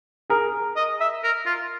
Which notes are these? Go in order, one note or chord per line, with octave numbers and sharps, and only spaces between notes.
G#4 A#4
D#5
E5
A#4
F4